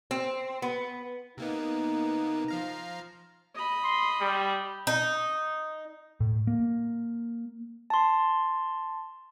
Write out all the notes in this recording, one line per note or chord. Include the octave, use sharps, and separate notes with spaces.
C4
B3
C3 A#3 B3 D#4
F3 F5 A#5
D#5 B5
C6
G3
D#4
A2
A#3
A5 C6